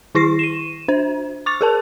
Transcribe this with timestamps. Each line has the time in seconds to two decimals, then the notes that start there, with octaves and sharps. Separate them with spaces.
0.15 D#3 E4 C#6 A#6 C7
0.39 D#7 E7
0.88 D4 C5
1.46 C#6 D6 A6 F7
1.61 G#4 A#4 A5